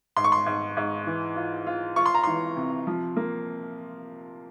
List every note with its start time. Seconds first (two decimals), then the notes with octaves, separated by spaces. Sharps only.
0.17 G#2 C6
0.24 C#6
0.32 C6
0.46 G#2
0.77 G#2
1.06 E3
1.36 F4
1.67 F4
1.96 F4 C#6
2.06 C6
2.15 A#5
2.24 E3 C6
2.57 C3
2.87 F3
3.17 A#3